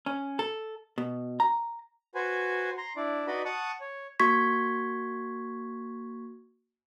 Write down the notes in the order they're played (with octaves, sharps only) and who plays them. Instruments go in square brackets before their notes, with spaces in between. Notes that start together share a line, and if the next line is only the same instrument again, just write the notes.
[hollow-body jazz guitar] C#4
A4
B2
A#5
[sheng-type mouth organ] F#4 B4 C5 G#5
A#5 C6
D4 E4 D5
D#4 F#4 B4 D5 D#5 B5
F#5 A5 C#6 D#6
C#5
[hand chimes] A#3 F#4 C#6 G#6 B6